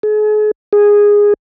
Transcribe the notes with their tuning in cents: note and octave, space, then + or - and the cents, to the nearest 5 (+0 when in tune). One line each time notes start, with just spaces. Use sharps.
G#4 +40
G#4 -10